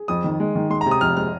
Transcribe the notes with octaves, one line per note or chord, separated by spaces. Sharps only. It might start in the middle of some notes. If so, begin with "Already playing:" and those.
Already playing: G#4
F2 D#6
D#3
G#3
D#3
G#3 C6
A#5
C3
D#6
F2 F6
G#3 F6